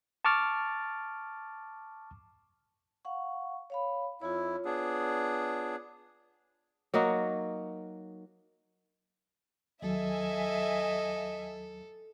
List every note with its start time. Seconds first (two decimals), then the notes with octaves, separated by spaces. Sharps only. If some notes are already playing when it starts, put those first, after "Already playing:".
0.25 A5 C#6 D6 F6 A6
3.05 F5 F#5 C#6
3.70 C#5 F5 B5
4.21 F2 E4 F4 C#5
4.65 B3 D4 G#4
6.94 F#3 A#3 D#4 F#4
9.82 D#2 F#3 A4 D#5 E5 G#5